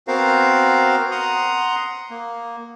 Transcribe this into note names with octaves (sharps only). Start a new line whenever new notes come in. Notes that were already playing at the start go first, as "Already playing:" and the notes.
B3 C4 F#4 A#4 C5 F5
F#5 A#5 C6 D#6
A#3